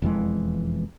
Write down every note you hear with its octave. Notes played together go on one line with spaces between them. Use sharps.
E1 F2 E3 G#3